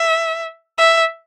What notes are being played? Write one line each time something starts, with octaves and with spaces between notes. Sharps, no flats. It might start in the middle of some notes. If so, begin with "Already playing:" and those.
Already playing: E5
E5